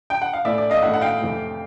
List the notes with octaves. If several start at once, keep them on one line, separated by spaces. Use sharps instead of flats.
G5
F#5
F5
A2 E3 A3 D5 E5
D5
D#5 F5
A2 E3 A3 E5 F#5
F#5
F5 G5
F2 C3 E3 A3